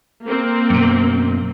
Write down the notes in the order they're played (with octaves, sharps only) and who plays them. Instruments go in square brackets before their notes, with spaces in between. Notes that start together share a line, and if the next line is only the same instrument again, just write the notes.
[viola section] A#3 C4
[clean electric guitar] F#2 B2